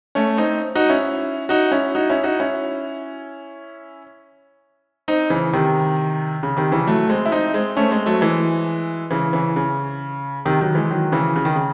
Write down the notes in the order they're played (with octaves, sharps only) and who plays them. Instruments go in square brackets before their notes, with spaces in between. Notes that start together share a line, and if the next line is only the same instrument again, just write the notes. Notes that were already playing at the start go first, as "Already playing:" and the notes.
[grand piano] A3 C#4
C4 D#4
D#4 F#4
C#4 E4
D#4 F#4
C#4 E4
D#4 F#4
C#4 E4
D#4 F#4
C#4 E4
C4 D#4
C#3 E3
C3 D#3
C#3
C3 D#3
C#3 E3
F#3 A3
G#3 C4
E4
C4 D#4
G#3 C4
A3 C#4
G#3 C4
F#3 A3
E3 G#3
C#3 E3
C#3 E3
C#3
C3 D#3
D#3 F#3
E3 G#3
D#3 F#3
C#3 E3
C#3
D#3
C#3